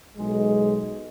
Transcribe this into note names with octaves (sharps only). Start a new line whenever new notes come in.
B1 G#3